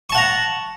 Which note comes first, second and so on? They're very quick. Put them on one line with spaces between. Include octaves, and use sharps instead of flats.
C#6 A5 F#5 A#5